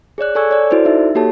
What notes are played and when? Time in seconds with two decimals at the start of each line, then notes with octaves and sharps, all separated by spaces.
0.18 G#4 C#5 D5 F#6
0.35 A4 D5 G#5 C#6 E6 G#6
0.51 C#5 D5
0.70 E4 F#4 A4 C5 D5
0.85 D#4 E5
1.15 A#3 F#4 G4 A4 C#5 A5